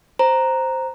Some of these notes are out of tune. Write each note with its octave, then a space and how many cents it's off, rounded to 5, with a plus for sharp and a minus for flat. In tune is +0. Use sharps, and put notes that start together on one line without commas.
C5 +0 A#5 +0